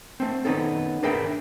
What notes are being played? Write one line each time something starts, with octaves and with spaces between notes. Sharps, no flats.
A3 C4
D#3 G#3 B3 C#4 D#4 A4
D4 G#4 A#4 B4 E5 G5